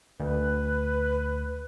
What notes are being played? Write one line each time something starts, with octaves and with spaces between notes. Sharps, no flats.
D2 B4